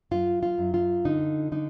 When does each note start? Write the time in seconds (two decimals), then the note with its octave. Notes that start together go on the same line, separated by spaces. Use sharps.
0.11 F#2 F4
0.43 F4
0.58 F#2
0.74 F4
1.05 D3 D#4
1.52 D3 D#4